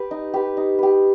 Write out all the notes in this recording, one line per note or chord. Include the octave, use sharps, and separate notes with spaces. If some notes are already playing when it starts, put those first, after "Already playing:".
Already playing: G4 B4
D#4
G4 B4
D#4
G4 B4